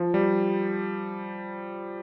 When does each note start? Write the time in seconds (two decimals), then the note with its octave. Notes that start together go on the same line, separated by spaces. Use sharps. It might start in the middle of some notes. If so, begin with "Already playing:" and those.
Already playing: F3
0.14 G3